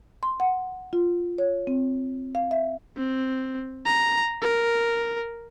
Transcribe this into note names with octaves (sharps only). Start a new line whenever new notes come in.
C6
F#5
F4
C#5
C4
F5
E5
C4
A#5
A#4